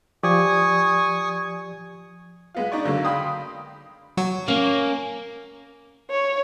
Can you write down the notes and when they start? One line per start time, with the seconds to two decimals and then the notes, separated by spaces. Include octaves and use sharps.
0.23 F3 G4 D5 G#5 C#6 D#6
2.54 G#3 B3 F4
2.72 D4 D#4 D5 C#6
2.85 D3 F#3 G#3 A#3
3.05 F5 G5 B5 C6 D#6
4.17 F#3 F#4
4.48 A#3 C#4
6.11 C#5